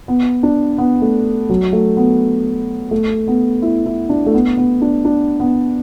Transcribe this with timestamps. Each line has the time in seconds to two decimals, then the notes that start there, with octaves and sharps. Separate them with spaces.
0.08 B3
0.43 D4
0.78 B3
1.02 A3
1.49 F#3
1.73 A3
1.97 B3
2.91 A3
3.28 B3
3.62 E4
3.86 E4
4.09 D4
4.26 A3
4.34 B3
4.57 B3
4.82 D4
5.05 D4
5.40 B3